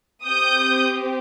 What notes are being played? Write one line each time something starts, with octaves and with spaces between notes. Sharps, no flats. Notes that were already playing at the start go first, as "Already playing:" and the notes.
C4 G4 D#6 G6